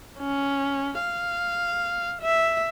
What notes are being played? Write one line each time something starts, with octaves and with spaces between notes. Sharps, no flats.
C#4
F5
E5